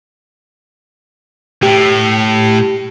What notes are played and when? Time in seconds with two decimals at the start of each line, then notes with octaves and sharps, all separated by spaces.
1.63 A2 G4